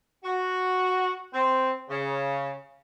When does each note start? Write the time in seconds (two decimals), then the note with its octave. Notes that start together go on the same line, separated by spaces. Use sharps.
0.24 F#4
1.34 C4
1.89 C#3